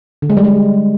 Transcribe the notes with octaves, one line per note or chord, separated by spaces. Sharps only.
D3
G#3
G3
G#3